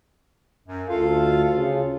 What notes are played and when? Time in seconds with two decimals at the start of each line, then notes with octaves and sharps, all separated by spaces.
0.67 F#2
0.89 D2 F4 A4 F5
1.50 C#3